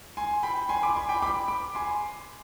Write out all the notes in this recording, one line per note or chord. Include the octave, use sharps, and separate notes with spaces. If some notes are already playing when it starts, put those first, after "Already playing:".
G#5 C6
G5 B5
G#5 C6
B5 D6
G#5 C6
G5 B5
B5 D6
B5 D6
G#5 C6